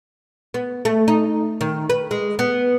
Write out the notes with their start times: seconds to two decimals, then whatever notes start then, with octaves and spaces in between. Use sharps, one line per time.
0.54 B3
0.85 A3
1.08 D#4
1.61 D#3
1.90 B4
2.11 G#3
2.39 B3